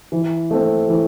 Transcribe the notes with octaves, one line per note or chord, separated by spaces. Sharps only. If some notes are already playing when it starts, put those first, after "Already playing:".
E3
A3 C4
E3